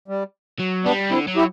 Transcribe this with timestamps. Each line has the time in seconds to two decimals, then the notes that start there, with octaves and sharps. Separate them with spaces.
0.08 G3
0.59 F#3
0.84 G3 B3 D4
1.11 D3 C4 E4
1.28 F#3
1.36 E4 G4